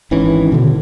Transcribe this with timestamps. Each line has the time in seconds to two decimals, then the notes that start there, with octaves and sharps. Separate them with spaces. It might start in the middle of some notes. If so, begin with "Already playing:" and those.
0.11 G#1 D#3 E3 C#4
0.52 B2 D3